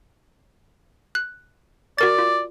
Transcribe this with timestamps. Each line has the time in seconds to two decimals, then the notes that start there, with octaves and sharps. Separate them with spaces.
1.15 F#6
1.98 F#4 A#4 D5 A6
2.18 F4